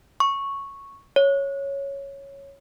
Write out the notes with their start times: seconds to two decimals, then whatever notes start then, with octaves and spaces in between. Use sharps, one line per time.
0.20 C#6
1.16 C#5